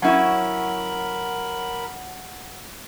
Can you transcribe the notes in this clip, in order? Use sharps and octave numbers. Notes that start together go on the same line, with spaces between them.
F#3 C#4 E4 A#4 F#5 A5 B5